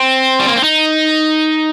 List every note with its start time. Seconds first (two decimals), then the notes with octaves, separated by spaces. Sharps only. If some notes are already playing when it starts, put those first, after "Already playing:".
Already playing: C4
0.40 G3
0.48 A#3
0.56 C4
0.64 D#4